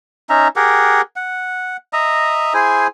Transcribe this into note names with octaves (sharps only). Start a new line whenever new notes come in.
C#4 D#4 E5 A#5
G4 G#4 A#4 F#5
F#5
D#5 E5 A#5
E4 G#4 C5 G#5